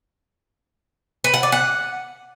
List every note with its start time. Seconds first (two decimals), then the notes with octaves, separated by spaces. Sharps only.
1.24 B4
1.34 F#5
1.43 D5
1.52 F#5